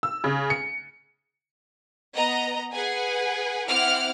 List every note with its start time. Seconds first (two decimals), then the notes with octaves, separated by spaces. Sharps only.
0.03 E6
0.24 C#3
0.50 C#7
2.15 B3 D#5 A#5
2.73 G#4 B4 F#5 G#5
3.69 C4 E4 F#5 D6 F6